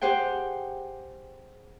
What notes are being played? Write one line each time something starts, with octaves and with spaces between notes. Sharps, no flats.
G4 G#4 C5 F#5 G5